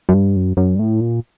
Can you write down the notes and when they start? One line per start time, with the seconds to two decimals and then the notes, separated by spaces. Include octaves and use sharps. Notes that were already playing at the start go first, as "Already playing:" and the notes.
0.09 F#2
0.14 G2
0.36 F#2
0.57 F#2
0.75 G2
0.79 A2
1.00 A#2